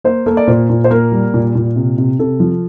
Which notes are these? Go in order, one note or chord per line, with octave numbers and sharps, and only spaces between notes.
A#3 C5
A#3 A4
D5
A#2 C5
A#2
C5
A#3 A#4
G3
A#2
A#2
C3
C3
C3 A4
F3